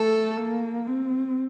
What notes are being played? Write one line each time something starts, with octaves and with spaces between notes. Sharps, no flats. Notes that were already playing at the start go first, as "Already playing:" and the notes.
Already playing: A3 A4
A#3
C4